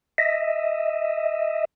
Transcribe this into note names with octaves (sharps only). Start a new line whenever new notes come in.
D#5 E5